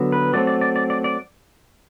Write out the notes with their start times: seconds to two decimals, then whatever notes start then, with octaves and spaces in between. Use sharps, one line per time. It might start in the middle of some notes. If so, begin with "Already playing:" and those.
Already playing: D3 F#3 B3
0.12 B4
0.33 F#3 A3 C4 D5
0.47 D5
0.61 D5
0.76 D5
0.90 D5
1.04 D5